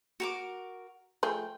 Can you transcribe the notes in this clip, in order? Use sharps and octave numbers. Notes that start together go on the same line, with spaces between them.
F#4 A#4 D6
F3 A3 G#4 G5